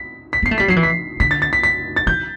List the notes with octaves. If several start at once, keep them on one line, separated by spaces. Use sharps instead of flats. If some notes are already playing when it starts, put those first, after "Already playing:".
Already playing: B6
B6
B3 C7
A3
G3 B6
F#3 C7
E3
B6
D3 B6
A6
A6
B6
B6
A6
E3 G6